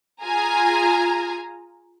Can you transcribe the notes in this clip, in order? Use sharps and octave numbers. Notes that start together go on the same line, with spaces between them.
F4 G#4 G#5 A#5